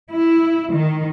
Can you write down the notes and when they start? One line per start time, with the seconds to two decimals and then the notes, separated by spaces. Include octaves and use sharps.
0.11 E4
0.72 D#3